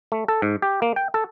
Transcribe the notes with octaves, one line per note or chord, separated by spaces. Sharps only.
A3
A4
G#2
G4
A#3
G5
A4